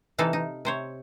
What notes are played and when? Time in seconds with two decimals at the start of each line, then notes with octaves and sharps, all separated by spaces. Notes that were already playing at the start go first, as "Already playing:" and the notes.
0.18 C3 E3 D#4 A4 F5
0.33 D#4
0.65 C3 C5 C#5